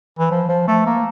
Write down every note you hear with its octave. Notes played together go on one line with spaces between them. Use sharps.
E3
F3
F3
A3
A#3